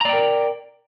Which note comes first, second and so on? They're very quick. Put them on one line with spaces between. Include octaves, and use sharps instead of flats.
A#5 D5 G5 A#4